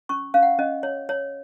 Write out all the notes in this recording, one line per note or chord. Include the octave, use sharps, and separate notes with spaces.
C#4 C#6
C#4 F5
F#5
C#4 D#5
C#5
C#5